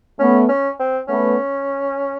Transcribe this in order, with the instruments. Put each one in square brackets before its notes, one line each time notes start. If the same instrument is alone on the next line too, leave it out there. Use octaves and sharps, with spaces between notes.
[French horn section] A3 B3 [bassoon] C#4
[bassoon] C#4
C4
[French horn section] A3 B3 [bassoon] C#4